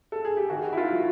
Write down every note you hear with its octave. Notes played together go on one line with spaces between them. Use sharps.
A4
G#4
G4
D#3 F#4
E4
F4
F#3